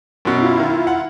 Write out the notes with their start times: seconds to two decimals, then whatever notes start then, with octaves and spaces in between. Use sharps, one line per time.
0.25 F#2 B2
0.42 E4 F4
0.59 D#3
0.87 F#5